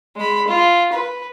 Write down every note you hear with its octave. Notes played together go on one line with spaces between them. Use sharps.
G#3 B5
F4
B4